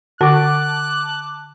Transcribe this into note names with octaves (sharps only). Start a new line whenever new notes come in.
D3 F#4 A5 D6 F#6